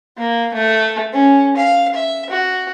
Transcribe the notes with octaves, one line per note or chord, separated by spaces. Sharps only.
A#3
A3
C#4
F5
E5
F#4